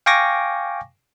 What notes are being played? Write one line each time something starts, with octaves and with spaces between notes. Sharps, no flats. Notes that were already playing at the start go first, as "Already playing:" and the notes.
F5 G5 G#5 C#6 D6 A#6